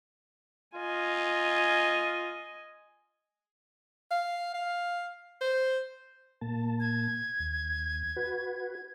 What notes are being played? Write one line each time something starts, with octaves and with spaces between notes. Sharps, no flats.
F4 D#5 G#5
F5
F5
C5
A#2 A#3 A5
G#6
D#2
F#4 B4